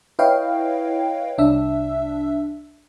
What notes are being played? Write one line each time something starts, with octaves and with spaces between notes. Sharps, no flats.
E4 B4 C#5 D#5 F5 G5
C2 D4 E5 E6